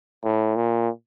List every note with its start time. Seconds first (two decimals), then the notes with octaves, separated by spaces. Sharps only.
0.24 A2
0.56 A#2